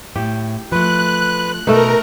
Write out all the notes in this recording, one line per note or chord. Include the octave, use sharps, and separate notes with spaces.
A2 G4
F3 A3 B4 F#6
B2 A3 D#4 A#4 B4 A#5